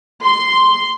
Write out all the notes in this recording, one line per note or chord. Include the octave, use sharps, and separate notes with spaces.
C6